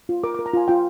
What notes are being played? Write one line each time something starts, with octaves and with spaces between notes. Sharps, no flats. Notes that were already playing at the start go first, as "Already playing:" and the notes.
F4
A#4 D6
A#4 D6
A#5
F4 G#5
F4 G5